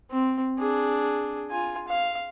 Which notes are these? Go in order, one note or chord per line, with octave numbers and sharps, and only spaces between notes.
C4
D4 G#4
F4 G#5
F5